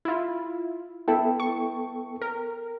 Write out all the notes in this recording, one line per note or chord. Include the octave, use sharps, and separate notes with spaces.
E4 F4
B3 E4 A4 G5
C#6
A#4